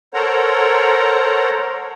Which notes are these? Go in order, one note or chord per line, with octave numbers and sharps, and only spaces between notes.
A4 A#4 C5 C#5 F#5 A#5